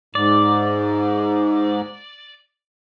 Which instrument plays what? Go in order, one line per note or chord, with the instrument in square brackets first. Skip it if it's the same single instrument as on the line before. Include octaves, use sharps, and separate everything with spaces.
[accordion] G#2 [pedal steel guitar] D5